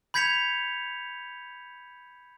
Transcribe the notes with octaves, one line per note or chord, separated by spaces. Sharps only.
B5 G6 G#6 B6 C#7 F7